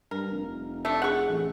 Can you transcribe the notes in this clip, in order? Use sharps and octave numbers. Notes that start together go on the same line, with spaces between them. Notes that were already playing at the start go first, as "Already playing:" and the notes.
G2 A#4
F1
A3 D4
G#4 F#5 C#6
A1